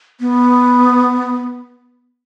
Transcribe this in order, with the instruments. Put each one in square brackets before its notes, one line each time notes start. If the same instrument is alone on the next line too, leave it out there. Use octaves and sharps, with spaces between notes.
[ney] B3